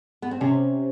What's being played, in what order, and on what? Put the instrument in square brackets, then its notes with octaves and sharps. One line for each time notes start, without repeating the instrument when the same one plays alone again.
[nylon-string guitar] B3
C4
[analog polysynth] C3 [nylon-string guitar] C#4